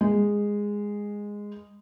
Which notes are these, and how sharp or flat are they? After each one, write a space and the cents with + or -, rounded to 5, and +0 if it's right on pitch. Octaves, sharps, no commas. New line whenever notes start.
G#3 -10